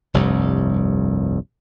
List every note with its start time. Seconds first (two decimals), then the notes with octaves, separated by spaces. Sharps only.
0.14 F1 C2 G2